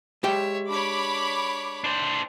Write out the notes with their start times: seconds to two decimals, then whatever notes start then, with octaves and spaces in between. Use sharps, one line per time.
0.23 G#3 G4 C#5 E5 G5
0.68 D4 C#5 B5 D6
1.84 D4 C5